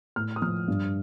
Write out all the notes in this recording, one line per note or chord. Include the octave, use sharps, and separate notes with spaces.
A2 F6
D#6
F3 F6
G2